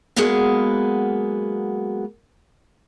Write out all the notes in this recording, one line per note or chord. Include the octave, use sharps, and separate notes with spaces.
F#3 G#3 A#3 B3 F#4 G#4